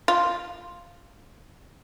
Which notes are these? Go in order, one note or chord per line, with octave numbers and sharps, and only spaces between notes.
F4